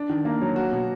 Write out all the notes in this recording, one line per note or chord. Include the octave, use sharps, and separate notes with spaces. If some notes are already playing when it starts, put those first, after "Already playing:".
Already playing: D4
D#3
A#3
F#3
F#4
B2